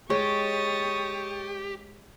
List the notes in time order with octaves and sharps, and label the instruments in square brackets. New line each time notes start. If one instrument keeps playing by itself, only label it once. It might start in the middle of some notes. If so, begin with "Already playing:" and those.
[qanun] G#3 [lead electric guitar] G4 [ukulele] C#5 [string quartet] C#6 D#6 A6